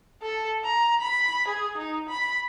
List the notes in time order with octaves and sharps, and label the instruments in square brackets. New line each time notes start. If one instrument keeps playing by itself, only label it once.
[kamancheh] A4
A#5
B5
G#4
D#4
B5